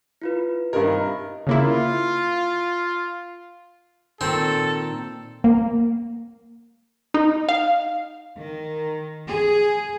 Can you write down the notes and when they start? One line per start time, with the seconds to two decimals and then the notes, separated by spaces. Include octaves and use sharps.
0.22 E4 F4 B4
0.73 G2 C3 D#3 D#4 G4 A#4
1.47 C#3 A#3 E4 F4
4.21 A#2 D#3 C4 A4
5.44 A#3
7.14 D#4
7.49 F5
8.36 D#3
9.28 G#4